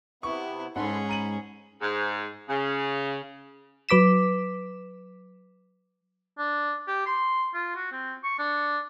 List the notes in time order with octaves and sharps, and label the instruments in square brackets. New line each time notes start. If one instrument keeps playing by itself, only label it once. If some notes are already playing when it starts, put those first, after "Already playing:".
[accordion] C3 B3 [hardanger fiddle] E4 [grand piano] C#6
[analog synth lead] G#2 [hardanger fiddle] C#4 G#4 [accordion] A4 B5 C6 [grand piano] F#5 A5
[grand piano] A#5 D#7 F#7 [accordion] B5
[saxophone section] G#2
C#3
[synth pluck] F#3 B4 D6 B6 E7
[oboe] D4
G4
C6
F4
F#4
C4
C#6
D4